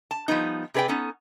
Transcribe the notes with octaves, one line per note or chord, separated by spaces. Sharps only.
A5
F3 G3 B3 D#4
C3 G#4 B4 D5 G5
B3 C#4 D#4 A4